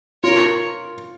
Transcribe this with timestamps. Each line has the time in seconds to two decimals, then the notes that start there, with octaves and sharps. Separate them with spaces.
0.24 F4 A#4 C#5